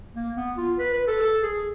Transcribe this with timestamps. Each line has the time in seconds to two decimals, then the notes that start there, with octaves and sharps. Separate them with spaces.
0.15 A#3
0.37 B3
0.57 F4
0.79 B4
0.93 B4
1.07 A4
1.21 A4
1.43 G#4